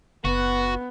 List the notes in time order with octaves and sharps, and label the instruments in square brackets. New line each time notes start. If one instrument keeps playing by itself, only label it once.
[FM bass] F#1 [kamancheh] B3 [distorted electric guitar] F#4